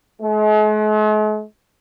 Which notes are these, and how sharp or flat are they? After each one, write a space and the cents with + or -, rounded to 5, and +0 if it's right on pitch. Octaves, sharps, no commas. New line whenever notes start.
G#3 +45